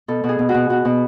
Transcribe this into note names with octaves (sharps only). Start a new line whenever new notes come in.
B2 A4
B2
G#4
B2
F#4
B2
B2 F#4
B2